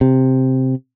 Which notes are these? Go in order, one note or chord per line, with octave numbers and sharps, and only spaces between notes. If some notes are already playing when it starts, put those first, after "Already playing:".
C3